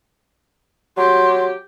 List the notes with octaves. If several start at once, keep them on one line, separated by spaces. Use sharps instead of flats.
F#3 G4 C6